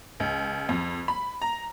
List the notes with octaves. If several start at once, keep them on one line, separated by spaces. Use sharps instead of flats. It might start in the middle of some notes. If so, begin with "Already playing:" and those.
C#2
F2
B5
A#5